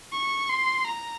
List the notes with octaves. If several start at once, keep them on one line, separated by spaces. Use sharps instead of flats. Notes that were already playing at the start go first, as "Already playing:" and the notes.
C#6
C6
A#5